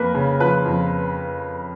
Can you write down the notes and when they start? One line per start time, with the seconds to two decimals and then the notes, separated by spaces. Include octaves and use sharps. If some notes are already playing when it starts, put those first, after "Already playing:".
Already playing: F2 A#3 A#4 B4
0.14 C#3
0.40 F3 B4
0.65 F2